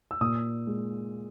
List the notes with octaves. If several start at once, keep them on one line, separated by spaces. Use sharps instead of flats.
E6
A#2 D#6
G#3